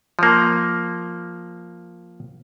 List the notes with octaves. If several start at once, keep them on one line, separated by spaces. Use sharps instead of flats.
F3 A#3